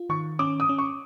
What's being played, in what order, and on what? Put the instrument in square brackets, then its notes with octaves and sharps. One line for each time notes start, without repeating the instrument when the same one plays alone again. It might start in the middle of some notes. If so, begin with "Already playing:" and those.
Already playing: [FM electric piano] F4
[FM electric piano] D#3 [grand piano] C#6
[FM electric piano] C#4 [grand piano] D6
[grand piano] D#6
[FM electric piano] C#4
[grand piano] C#6